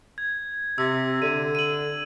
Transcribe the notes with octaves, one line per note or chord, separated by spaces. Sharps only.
G#6
C3 E6
D3 D#7
D#7 F#7